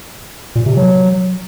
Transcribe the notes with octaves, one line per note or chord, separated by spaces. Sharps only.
A#2
C3
F#3